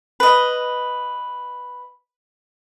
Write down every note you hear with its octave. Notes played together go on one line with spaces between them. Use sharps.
B4 D#5